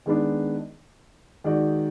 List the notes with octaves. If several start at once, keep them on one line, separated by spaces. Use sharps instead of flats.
D#3 G#3 B3 D4
D#3 G#3 D#4 F#4 D5